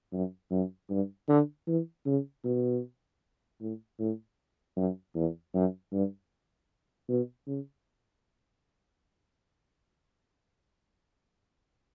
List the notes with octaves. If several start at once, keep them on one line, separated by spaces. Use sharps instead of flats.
F#2
F#2
G2
D3
E3
C#3
B2
A2
A2
F#2
E2
F#2
G2
B2
C#3